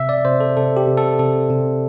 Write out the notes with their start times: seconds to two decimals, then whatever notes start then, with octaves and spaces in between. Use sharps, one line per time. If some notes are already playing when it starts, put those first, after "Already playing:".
Already playing: C3 E5
0.09 D5
0.25 C3 C5
0.40 A4
0.57 C3 A4
0.77 G4
0.87 C3
0.97 A4
1.19 C3 A4
1.50 C3